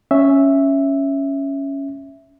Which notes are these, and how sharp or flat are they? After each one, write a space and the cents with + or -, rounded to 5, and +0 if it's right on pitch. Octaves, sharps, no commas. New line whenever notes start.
C#4 +0 E5 +0